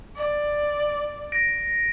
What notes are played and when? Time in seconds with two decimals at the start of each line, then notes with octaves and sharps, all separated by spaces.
0.16 D5
1.32 A#6 D7